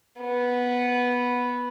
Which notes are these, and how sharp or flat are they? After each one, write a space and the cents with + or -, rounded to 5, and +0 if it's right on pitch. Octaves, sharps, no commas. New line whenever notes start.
B3 -5